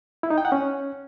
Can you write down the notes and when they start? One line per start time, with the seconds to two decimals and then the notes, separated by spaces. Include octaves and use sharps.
0.23 E4
0.30 D#4
0.38 G5
0.45 F#5
0.52 C#4